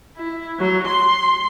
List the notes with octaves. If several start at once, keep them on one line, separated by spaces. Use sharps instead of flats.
E4
F#3
C6